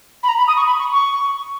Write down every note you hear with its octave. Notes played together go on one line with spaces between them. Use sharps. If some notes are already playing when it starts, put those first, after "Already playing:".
B5
A#5
B5
D#6
C#6
B5
C#6
C#6